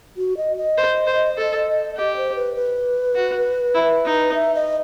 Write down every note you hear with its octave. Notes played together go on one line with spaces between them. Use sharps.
F#4
D#5
D#5
C5
C5
A4
G4 D#5
C5
B4
B4
F#4
E4
D#4
E5
D#5